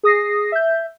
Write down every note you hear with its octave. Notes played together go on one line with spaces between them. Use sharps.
G#4 D#6 A#6 C7
E5 G6